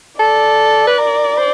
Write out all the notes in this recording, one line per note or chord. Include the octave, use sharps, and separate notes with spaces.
A4 D5
B4
A#4
C5